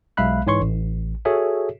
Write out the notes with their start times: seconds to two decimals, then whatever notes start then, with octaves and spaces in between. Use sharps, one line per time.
0.17 B1 G#3 E5 F5 B5 F#6
0.47 G#2 E3 C#5 C6 C#6
0.61 A1
1.25 F#4 G#4 A4 C#5 E5